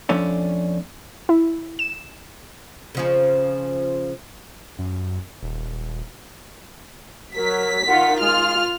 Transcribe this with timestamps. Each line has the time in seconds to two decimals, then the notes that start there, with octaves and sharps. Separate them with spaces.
0.09 F2 A3 C#4 D4
1.29 E4
1.79 E7
2.95 C#3 F3 C#4
4.79 F#2
5.43 D#1
7.36 F#3 A#4 B6
7.87 D#3 F4 F#5
8.20 G#3 F4 F6